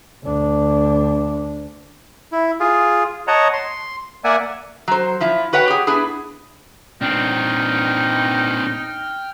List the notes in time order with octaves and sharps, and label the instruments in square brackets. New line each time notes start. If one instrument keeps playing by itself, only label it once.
[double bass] D2 D4
[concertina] E4
F4 G#4
C#5 D#5 F#5 A5 A#5
C6
A#3 D5 E5 F#5 G#5
[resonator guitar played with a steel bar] F#3 C5
F3 E4 F4
F#4 B4 C#5 F#5 G5
G4 G#4
B3 D4 E4 G#4
[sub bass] A#2 [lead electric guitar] C4 D4 [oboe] D#4 [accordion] G5 F6